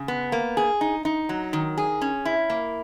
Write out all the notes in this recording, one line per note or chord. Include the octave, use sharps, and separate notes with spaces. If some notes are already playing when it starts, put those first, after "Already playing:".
Already playing: C#3
B3
A#3
G#4
D#4
D#4
F#3
D#3
G#4
C#4
E4
A#3